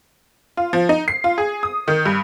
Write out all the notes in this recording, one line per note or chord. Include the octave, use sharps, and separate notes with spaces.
F4
F3
D#4
C7
F4
G#4
D#6
D#3
G2